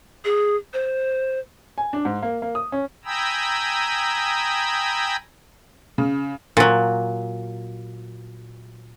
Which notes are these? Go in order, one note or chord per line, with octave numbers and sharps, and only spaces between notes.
G#4
C5
G#5
D4
G#2
A#3
A#3
D#6
C#4
G5 G#5 A#5 B5 D#6 E6
C#3
A#2 F#3